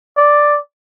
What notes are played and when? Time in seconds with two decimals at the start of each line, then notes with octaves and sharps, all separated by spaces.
0.17 D5